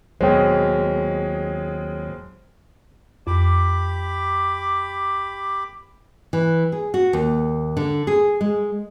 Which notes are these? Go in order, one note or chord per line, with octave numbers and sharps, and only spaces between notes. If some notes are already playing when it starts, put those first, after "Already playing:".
D#2 B2 F#3 G#3 C5 C#5 G5
F2 G4 B5 D6
E3
G#4
F#4
D#2
D3
G#4
G#3